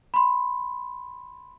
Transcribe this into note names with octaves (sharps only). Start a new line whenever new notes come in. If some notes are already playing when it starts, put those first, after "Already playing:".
B5 C6